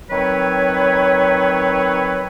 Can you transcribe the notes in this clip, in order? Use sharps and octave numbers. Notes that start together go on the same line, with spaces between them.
D#3 F#3 C4 B4 C#5